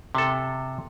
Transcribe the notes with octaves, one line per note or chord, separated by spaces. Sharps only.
C3 A4